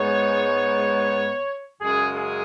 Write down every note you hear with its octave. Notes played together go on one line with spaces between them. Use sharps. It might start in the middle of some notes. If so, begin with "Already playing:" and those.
Already playing: G#2 G#3 B3 C#5
F#2 C#3 G#3 G#4
G#4